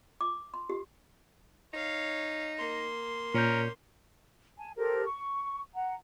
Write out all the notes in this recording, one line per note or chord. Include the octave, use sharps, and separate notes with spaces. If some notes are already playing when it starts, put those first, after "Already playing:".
D6
C6
G4
D#4 C#5 F5
A#3 C6
A#2 C#4 A#4 G6
G#5 A5
G4 A4 A#4 C5
C#6
F#5 A#5